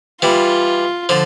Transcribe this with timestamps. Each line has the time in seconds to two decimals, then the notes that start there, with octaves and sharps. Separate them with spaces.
0.22 E3 G3 F4
1.09 D3 F3